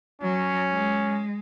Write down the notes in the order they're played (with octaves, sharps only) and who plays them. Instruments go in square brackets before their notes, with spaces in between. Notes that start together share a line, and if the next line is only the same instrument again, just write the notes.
[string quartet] F#3 [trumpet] C#4
[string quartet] G#3